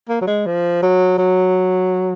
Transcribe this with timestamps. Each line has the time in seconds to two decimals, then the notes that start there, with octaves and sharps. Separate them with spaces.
0.09 A#3
0.21 F#3
0.27 G#3
0.46 F3
0.83 F#3
1.18 F#3